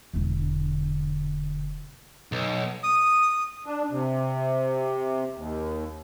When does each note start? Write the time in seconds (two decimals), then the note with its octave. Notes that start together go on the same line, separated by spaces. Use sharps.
0.13 E1 D3
2.32 B1
2.83 D#6
3.66 D4
3.91 C3
5.37 D#2